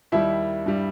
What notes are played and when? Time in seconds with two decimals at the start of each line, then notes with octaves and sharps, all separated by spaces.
0.12 D#2 D#3 G3 E4 E5
0.66 G2 G3